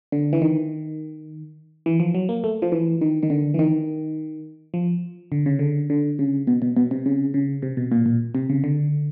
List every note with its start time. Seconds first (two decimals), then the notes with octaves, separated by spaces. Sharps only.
0.12 D3
0.33 E3
0.42 D#3
1.86 E3
2.00 F3
2.15 F#3
2.29 A#3
2.44 A3
2.62 F3
2.72 E3
3.01 D#3
3.23 D#3
3.30 D3
3.54 E3
3.59 D#3
4.74 F3
5.32 D3
5.46 C#3
5.59 D3
5.90 D3
6.19 C#3
6.47 B2
6.62 B2
6.76 B2
6.91 C3
7.06 C#3
7.34 C#3
7.62 C3
7.77 B2
7.92 A#2
8.06 A#2
8.35 C3
8.49 C#3
8.64 D3